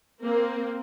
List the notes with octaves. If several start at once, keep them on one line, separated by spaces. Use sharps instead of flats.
A#3 C4